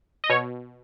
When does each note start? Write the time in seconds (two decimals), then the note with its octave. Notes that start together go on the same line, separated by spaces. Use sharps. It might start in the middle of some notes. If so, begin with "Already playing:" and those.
0.24 D#5
0.29 B2 C#5